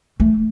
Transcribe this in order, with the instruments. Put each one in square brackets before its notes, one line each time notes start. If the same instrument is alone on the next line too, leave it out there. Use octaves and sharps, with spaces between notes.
[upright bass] A3